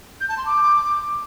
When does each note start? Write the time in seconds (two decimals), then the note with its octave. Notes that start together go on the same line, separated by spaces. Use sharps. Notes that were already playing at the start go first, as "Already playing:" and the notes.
0.21 G6
0.29 A5
0.37 C6
0.46 D6